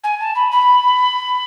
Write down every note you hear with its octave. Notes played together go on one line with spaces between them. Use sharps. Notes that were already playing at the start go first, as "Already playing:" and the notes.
G#5
A5
B5
B5